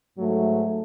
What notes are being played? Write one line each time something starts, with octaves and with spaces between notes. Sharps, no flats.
G#2 F#3 A3